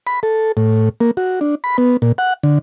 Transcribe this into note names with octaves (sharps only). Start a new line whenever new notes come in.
B5
A4
A2
A#3
F#4
D4
B5
B3
A#2
F#5
D3